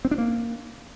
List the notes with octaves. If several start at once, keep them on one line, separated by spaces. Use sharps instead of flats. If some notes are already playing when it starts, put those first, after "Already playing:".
C4
D4
A#3